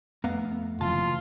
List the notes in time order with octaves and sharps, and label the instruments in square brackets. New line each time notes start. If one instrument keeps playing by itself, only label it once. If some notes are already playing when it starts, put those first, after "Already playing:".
[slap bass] F2 [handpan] A3 [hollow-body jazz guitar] B3 F5 A#5
[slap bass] F1 D#2 [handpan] C#3 E3 F#3 [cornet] F4 [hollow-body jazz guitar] A5